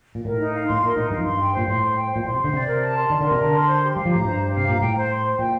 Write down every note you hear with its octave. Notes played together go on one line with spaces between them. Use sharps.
A#2
A2 A#4
D#4
F5
A2 C6
A#2 A#4
A2 D#4
G2 F5
F2
G2 C6
G5
A#2 C5
A2 C6
C5
G5
A#2 C5
A2 C6
C3
C5
D3
C3 D5
A#4
A5
C6
D#3 D5
D3 A#4
C3
D3 A5
C6
C5
G4
G3 F5
F3
A2 A#5
G2 C5
G4
C3 F5
A#2 A#5
A2 G5
C5
C6
C5
A#2 G5